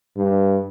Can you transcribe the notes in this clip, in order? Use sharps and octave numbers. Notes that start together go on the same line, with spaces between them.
G2